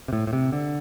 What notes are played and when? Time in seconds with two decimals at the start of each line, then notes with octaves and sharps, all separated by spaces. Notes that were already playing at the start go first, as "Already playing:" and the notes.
0.08 C3
0.13 A2
0.27 A2
0.33 C3
0.52 D3